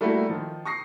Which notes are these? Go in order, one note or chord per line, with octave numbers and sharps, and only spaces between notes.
G3 A3 A#3 E4 F#4
D#3 F3
C#6 D#6 A#6 C7